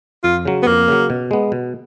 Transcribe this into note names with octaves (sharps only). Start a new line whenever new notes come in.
F2 F4
C#3 F#3
B3
F2 A#3
C#3 F#3
B2
G#3 B3
B2